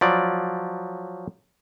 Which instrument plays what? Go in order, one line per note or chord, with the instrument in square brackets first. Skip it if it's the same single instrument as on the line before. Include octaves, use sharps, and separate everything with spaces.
[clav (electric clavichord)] F3 F#3 D5